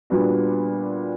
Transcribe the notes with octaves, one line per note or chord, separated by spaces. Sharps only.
A#2 G3 B3 D4 F#4